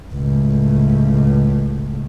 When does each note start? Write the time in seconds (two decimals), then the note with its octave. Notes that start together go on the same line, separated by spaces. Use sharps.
0.14 C#2 A2